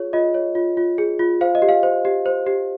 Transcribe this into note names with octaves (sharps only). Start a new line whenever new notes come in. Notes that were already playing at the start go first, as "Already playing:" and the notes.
Already playing: F4 G#4 C#5
F4 D#5
C#5
F4
F4
G#4
F4
C5 F5
D#5
G4
F5
C5
G4
C5
G4